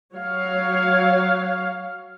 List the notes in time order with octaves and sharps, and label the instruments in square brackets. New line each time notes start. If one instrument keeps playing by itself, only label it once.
[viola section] F#3 C#5 F5